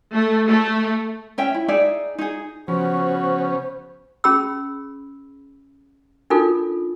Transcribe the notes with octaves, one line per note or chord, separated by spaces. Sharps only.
A3
A3
C#4 E5 G5
E4
D#4 G#4 D5 E5
D#4 G#4
C#3 F3 B3 C#4 F#4 C5
C#4 G#4 B5 E6
D4 D#4 F4 A4 A#4